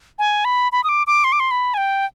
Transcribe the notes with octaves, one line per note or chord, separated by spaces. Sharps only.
G#5
B5
B5
D#6
D6
D6
C6
D6
C6
B5
G#5
G5